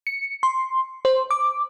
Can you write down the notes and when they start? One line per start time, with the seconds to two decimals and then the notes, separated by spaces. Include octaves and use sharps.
0.07 C#7
0.43 C6
1.05 C5
1.31 D6